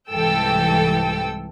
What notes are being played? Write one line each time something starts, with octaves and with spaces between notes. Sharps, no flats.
C2 G#2 E3 A4 G5 E6